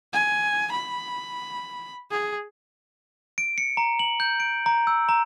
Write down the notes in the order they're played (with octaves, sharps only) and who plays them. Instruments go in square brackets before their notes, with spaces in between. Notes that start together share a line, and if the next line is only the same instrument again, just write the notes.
[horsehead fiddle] G#5
B5
G#4
[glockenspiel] D7
C#7
A#5
F#7
G6
D7
A#5
E6
A#5